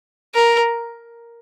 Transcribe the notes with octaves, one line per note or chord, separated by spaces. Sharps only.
A#4